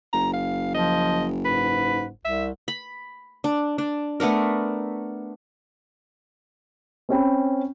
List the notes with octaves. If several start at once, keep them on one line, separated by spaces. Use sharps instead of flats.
F#1 A#5
F5
F3 D#5
G#2 B4
C2 E5
B5
D4
D4
A3 B3 D4 A#4
C4 C#4 G5 B5